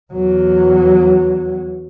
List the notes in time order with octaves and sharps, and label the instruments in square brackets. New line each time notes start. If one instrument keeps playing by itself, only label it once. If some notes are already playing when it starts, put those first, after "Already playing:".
[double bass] E2 F#3